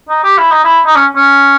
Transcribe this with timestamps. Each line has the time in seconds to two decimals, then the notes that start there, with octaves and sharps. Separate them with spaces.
0.09 D#4
0.24 G4
0.38 E4
0.51 D#4
0.64 E4
0.86 D#4
0.95 C#4
1.16 C#4